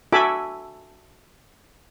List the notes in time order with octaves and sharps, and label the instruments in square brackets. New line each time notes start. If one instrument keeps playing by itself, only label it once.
[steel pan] F#4 A4 E5 G#5 B5 D6